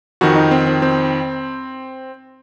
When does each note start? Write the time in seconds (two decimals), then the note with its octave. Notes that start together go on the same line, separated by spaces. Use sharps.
0.21 F2 D#3 F#4
0.36 D#4
0.51 C4
0.67 C4
0.82 C4